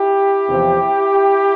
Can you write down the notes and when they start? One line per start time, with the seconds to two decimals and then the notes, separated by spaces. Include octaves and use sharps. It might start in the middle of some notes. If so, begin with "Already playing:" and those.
Already playing: E4 G4
0.47 E2 C3 F3 C4